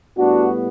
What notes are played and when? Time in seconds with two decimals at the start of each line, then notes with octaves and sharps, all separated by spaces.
0.17 A2 G3 B3 D4 F#4